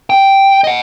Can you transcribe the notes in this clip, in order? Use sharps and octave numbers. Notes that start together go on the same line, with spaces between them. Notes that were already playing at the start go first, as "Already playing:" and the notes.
G5
D#5 F#5